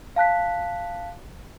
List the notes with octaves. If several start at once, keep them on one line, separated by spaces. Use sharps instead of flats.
F5 A5 F#6 B6